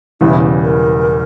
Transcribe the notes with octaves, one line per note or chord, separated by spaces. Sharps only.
E1 E2 C#3 E3 G3 E4
A#4